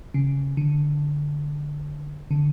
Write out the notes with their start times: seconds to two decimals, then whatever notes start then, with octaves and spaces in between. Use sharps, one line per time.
0.14 C#3
0.57 D3
2.31 D3